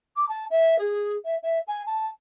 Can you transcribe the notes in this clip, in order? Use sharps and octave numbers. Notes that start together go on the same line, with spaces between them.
D6
A5
E5
G#4
E5
E5
G#5
A5